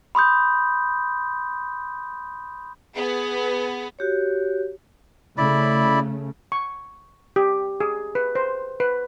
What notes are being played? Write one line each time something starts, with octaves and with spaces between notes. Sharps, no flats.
B5 C6 D#6 G6
B3 G#4
F#4 G4 C#5
C#3 A3 E4 D5 B5
C#6
G4
G#4
B4
C5
B4